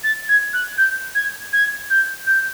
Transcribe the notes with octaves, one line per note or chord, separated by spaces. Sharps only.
A6
G#6
F#6
G6
G#6
G#6
G6
G6